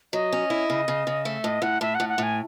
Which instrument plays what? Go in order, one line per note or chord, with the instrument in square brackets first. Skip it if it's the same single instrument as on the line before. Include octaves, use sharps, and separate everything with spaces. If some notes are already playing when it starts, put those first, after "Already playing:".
[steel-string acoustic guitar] F#3 [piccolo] D#5
[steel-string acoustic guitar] C#4
E4
C#3
C#3
C#3
[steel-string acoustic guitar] A3 [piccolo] E5
[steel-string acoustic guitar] A2 [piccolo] D#5
[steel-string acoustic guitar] A2 [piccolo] F#5
[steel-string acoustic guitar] A2 [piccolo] E5
[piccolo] F#5
[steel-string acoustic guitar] A2
[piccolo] F#5
[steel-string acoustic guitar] A2 [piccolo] G#5